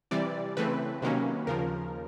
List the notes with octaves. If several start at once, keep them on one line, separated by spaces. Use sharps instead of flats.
C3 E3 G3 D5
C#3 E3 A3 C4 B4
C3 D#3 F#3 A#3 C#4
D#2 C#3 F3 A#4